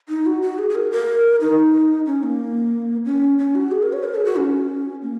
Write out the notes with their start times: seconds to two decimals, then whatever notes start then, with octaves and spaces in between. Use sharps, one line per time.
0.09 D#4
0.26 F#4
0.42 F#4
0.59 G#4
0.70 G#4
0.75 A#4
0.92 A#4
1.41 D#4
2.06 C#4
2.23 A#3
3.05 C#4
3.39 C#4
3.55 F#4
3.72 G#4
3.82 A#4
3.93 C#5
4.04 A#4
4.15 G#4
4.25 F#4
4.36 C#4
5.02 A#3